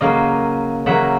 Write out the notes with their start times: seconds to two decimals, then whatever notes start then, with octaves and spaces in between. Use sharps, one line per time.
0.01 C#3 F#3 A#3 D#5 F5
0.86 C#3 F#3 A#3 E5 F#5